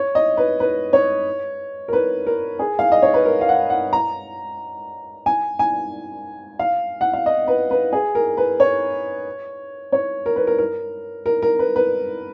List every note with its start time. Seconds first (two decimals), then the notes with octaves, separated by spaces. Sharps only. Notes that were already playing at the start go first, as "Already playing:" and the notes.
Already playing: C#5
0.15 D#5
0.37 B4
0.60 B4
0.93 C#5
1.88 A#4
1.93 B4
2.27 A#4
2.59 G#4
2.79 F5
2.92 D#5
3.02 C#5
3.14 B4
3.26 A#4
3.41 F5
3.49 F#5
3.70 F#5
3.93 A#5
5.26 G#5
5.59 G#5
6.59 F5
7.01 F#5
7.13 F5
7.26 D#5
7.48 B4
7.71 B4
7.93 G#4
8.15 A#4
8.37 B4
8.60 C#5
9.92 C#5
10.26 A#4
10.36 B4
10.47 A#4
10.59 A#4
11.26 A#4
11.42 A#4
11.59 B4
11.76 B4